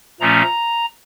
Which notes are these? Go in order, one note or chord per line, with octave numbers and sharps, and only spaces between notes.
A#2 F3 A3 C#4 A#5